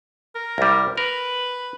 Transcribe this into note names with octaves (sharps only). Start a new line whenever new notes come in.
A#4
C2 G3
A#4 B4